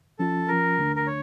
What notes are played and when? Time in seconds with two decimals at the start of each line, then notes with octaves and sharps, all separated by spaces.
0.19 F3 C#4 F4 A4
0.48 F3 C#4 F4 A#4
0.78 D2 D3 A3 D4
0.96 A#4
1.07 C#5